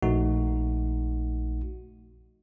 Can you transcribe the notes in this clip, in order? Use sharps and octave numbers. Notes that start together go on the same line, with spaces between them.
A#1 A3 D#4 F#4